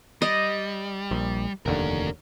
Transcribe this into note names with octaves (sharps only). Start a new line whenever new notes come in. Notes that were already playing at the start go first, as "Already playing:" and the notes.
G3 D#5
A#1
F1 D#2 D3 C#4 A#4